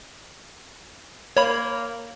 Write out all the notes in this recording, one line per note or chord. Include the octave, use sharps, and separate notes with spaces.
A#3 C#5 B5